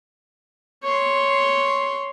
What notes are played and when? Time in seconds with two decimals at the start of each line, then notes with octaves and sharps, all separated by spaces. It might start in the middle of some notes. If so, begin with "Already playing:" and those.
0.84 C#5 C6